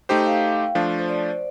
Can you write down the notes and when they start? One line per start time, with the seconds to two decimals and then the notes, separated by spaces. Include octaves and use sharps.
0.09 A3 D#4 G4 C5 G5
0.26 F5
0.75 F3 A3 D4 F4
0.99 C5
1.09 D5